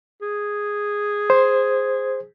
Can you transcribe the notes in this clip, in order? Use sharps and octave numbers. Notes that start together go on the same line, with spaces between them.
G#4
C5